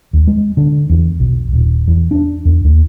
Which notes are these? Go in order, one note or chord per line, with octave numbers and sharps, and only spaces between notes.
D#2
G#3
D3
E2
B1
D#1
E2
D4
E2
D#2